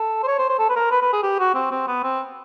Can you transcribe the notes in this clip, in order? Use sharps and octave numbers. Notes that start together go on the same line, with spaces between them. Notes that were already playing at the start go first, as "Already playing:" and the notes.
Already playing: A4
C5
C#5
C5
C5
A4
B4
A#4
B4
B4
G#4
G4
F#4
C4
C4
B3
C4